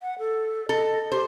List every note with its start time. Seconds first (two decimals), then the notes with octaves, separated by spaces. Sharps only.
0.02 F#5
0.19 A4
0.69 A4 D#5
1.12 G4 C5